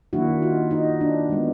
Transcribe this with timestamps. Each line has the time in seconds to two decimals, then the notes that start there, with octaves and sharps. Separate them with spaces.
0.13 D#3 F#3 A#3 D4 E4 F#4
0.42 D#4 F4
0.71 D#4
1.01 D4
1.29 E3 G#3 B3